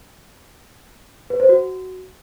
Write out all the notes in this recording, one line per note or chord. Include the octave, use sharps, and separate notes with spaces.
B4
C5
F#4